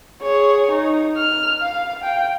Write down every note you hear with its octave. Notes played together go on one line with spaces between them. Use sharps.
G#4 C#5
D#4
F6
F5
G5